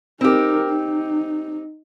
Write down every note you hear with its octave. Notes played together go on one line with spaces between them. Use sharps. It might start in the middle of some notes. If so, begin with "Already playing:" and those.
C4 D#4 G4 A#4
D#4